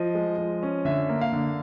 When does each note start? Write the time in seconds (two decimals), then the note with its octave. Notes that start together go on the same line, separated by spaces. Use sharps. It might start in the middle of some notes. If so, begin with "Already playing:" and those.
Already playing: F3 D#5
0.15 G#3
0.38 F3
0.63 C#4
0.85 D3 E5
1.09 A#3
1.21 F5
1.33 D3